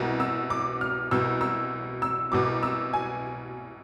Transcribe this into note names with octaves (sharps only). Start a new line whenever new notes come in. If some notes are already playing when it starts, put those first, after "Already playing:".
Already playing: C2 B2
E6
D6
F6
C2 B2 E6
E6
E6
C2 B2 D6
E6
G#5